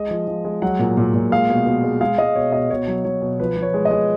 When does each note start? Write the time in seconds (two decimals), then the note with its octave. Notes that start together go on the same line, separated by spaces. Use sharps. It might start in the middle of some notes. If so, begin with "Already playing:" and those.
Already playing: G#3 D#5
0.11 F3
0.28 F3
0.45 G#3
0.62 F#3 F#5
0.79 A#2
0.97 A#2
1.14 A#2
1.32 G#3 F5
1.49 B2
1.66 B2
1.84 G#3
2.01 G#3 F5
2.18 G#3 D#5
2.35 B2 C#5
2.52 B2 D#5
2.70 B2 C#5
2.87 F#3
3.04 F#3 C#5
3.22 B2
3.39 F3 B4
3.57 F3
3.62 C#5
3.74 G#3
3.85 D#5
3.91 G#3